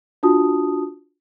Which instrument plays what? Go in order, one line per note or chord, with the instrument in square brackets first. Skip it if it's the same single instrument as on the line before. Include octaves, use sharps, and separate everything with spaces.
[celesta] D4 F4 F#4 A5 D#6